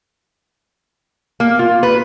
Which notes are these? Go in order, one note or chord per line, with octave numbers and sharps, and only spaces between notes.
A#3
F4
B4